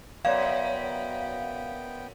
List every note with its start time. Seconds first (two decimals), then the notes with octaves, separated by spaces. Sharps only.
0.25 F#2 B3 C#5 D5 F5 G5 G#6